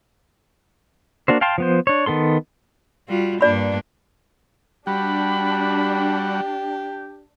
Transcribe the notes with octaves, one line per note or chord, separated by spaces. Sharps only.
A#3 D4 F#4 C5
F5 G5 A5 C6
F3 B3 C5
D4 C#5
D#3 B3 A4 C6
G3 F4 F#4
G2 A#3 D4 F4 D5 B5
G3 D4 F#4 G4 B5